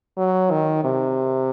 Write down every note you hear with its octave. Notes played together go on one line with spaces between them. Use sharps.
F#3
D#3
C3